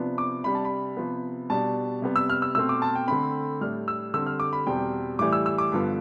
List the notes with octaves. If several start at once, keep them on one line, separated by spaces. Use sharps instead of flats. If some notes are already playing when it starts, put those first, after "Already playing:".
Already playing: C3 F3 B3 D4
D6
C3 G3 D4 B5
A5
B5
C3 F3 B3
B2 G3 D4 A5
C3 G3 B3
E6
F6
E6
B2 A3 C4 E6
D6
A5
G5
D3 A3 C4 B5
A2 G3 D4 F6
E6
D3 G3 C4 E6
F6
D6
B5
E2 B2 G3 C4 G5
A2 E3 G3 D6
E6
E6
D6
G2 D3 F3 B3